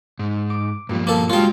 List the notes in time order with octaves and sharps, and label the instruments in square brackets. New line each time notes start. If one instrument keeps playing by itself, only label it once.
[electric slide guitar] G#2
[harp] D6
[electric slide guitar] G2 F3 [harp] A#2 G3 F4
[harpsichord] A#3 A4
[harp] G2 G#3 [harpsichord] F4 G5 [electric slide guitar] F#4 A5